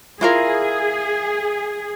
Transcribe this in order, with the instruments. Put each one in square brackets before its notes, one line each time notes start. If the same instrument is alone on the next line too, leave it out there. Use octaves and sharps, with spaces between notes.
[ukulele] E4 F4 A#4 [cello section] G#4